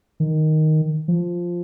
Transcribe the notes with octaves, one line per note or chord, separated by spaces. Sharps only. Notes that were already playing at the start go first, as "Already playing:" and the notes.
D#3
F3